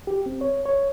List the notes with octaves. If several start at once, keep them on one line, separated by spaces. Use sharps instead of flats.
G4
C4
C#5
C#5